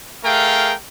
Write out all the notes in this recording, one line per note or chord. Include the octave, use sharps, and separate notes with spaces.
A3 G#4 A#4 F5 G5